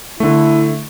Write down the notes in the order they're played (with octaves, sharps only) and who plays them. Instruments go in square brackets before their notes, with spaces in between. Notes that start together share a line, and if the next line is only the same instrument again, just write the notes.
[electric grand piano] D3 A3 [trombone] E4